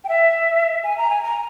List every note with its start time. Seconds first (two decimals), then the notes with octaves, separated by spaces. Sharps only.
0.04 G5
0.09 E5
0.84 G#5
0.98 A#5
1.10 G#5
1.23 A#5